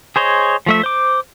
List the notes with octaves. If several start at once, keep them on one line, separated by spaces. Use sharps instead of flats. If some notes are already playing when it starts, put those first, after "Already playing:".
G#4 C5 C#5 D#5
F3 A3 E5
C5 D6